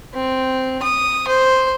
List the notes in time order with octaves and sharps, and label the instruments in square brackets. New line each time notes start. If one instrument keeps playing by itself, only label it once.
[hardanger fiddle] C4
D#6
C5